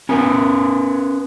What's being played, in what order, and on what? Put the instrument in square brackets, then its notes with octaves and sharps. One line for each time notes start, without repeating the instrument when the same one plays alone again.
[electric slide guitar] C#4 A#4 B4